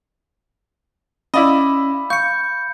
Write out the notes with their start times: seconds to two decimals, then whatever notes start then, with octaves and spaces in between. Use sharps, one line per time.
1.34 C#4 E4 D5 D#5 F5 B5
2.10 F5 C#6 G6 C#7